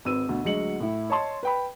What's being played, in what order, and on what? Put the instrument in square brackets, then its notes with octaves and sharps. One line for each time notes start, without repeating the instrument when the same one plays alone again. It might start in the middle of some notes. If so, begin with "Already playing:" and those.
[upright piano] G#1 C4 B4 E6 D#7
D2 B2
D2 F#3 G#3 C#7 F#7
A2 E4
C#5 D#5 A5 C6
B4 G5 B5